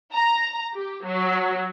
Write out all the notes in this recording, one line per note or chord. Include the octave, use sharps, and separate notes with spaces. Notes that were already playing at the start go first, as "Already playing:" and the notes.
A#5
G4
F#3